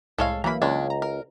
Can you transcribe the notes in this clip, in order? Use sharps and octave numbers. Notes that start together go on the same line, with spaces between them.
C2 A2 G#3 A4 C#5 F5
E3 F#3 A#3 A#5 B5
C#2 G#3 C#4 D4
A#5
A#4